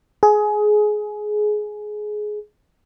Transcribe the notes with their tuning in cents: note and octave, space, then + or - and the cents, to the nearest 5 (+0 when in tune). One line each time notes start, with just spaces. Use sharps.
G#4 +20